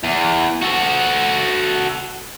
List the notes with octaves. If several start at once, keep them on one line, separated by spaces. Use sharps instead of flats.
E2
F#4 A4